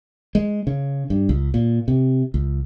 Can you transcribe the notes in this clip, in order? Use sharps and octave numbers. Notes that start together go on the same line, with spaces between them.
G#3
C#3
G2
C#2
A#2
C3
C#2